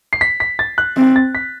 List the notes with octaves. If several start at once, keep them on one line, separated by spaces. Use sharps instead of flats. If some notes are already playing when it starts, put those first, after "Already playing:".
C7
B6
B6
A6
F#6
C4
A6
B6